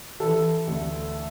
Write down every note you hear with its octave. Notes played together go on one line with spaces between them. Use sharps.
E3 A4
D2